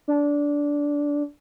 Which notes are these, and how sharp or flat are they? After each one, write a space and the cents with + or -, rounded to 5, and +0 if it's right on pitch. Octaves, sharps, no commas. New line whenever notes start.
D4 -15